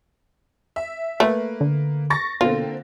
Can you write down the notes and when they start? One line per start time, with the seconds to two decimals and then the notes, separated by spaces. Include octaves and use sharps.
0.76 E5
1.20 A3 A#3 B4
1.61 D3
2.10 C#6 A6 A#6
2.41 B2 D3 A#3 C4 F4